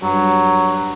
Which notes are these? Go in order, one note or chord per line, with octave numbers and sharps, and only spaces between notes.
G2 F#3